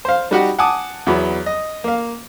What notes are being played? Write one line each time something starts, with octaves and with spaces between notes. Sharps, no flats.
C5 F5
G3 D#4 F#4 G4 F#5
F#5 G#5 A5 D6 D#6
E2 F#3 B3
D#5
A#3 F5